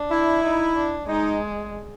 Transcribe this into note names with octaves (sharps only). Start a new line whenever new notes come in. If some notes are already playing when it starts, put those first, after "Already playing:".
Already playing: D4
E4
D#4
D4
G#3 D#4